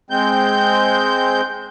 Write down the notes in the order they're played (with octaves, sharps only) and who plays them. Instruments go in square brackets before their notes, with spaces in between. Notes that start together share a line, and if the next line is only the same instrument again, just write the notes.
[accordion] G#3 C4 G6